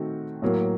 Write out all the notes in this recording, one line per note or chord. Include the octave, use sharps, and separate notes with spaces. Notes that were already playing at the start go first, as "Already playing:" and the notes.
Already playing: D#3 A3 C4 F#4
A2 F#3 A#3